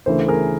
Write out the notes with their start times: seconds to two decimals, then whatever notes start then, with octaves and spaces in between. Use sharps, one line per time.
0.06 D2 C#3 E3 A3 A#4 C5
0.28 G#4 A#4